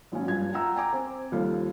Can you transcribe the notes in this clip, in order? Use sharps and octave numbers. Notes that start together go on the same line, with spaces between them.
G#1 A#2 F#3 C#4
G2 F3 G#6
F4 F#5 G5 A#5 E6
G5 G#5 A#5 D6
C4
D#2 F3 G3 A4 F5